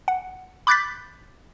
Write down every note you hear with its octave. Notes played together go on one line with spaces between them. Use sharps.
F#5
B5 D6 F#6 G6 A6 B6